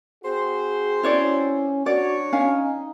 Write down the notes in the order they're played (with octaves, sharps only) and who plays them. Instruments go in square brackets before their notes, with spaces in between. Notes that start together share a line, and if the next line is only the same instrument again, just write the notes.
[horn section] C4 F#4 C5 [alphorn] G#4
[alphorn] C#4 [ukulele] E4 C#5 D5
[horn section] F#3 D4 C#5 [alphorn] F#4 [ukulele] D5
[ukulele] C#4 F5 G#5 [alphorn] D#4